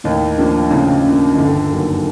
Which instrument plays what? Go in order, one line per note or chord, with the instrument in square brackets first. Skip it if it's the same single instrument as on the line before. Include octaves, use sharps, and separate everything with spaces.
[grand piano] D#2 D#3 [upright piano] A2
[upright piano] F3 A#3 D4
[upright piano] A2 [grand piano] C#3
[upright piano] F3 A#3 D4
[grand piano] D#3
[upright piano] G1 [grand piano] D3
[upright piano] F#2 D#3 F#3 A#3